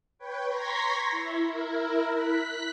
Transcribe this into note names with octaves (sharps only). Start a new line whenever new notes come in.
B4 C#5 G5
A#5 C6 C#6 G#6 A#6 B6
E4
E4 A#4
F#6 B6